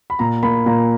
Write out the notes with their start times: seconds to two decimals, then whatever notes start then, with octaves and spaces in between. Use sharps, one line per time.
0.10 B5
0.19 A#2 A#5
0.43 A#3 B5
0.66 A#2 A#5